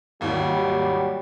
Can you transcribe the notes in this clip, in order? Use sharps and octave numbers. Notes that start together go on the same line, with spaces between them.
G#1 D#2 E3 F#3 G3